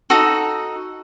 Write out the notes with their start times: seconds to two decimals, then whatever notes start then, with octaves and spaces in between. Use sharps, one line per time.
0.10 D#4 F#4 A4